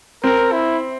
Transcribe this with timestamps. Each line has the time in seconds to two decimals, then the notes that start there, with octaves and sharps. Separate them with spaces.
0.24 C4 A#4
0.52 E4